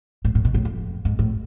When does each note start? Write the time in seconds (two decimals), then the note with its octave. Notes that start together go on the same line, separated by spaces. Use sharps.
0.25 A2
0.35 A2
0.45 B2
0.54 A2
0.65 F2
1.05 G#2
1.19 A2